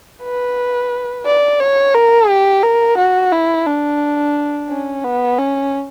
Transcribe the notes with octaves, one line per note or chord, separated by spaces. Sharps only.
B4
D5
C#5
A#4
G4
A#4
F#4
E4
D4
C#4
B3
C#4